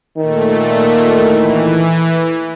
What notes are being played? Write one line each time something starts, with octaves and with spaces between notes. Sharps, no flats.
A#2 D#3 A3
E3